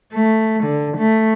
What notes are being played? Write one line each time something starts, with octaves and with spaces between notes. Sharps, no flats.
A3
D3
A3